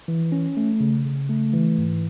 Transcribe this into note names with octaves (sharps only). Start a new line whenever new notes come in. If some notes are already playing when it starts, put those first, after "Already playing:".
E3
C#4
A3
C#3
C#3
A3
E3
G#2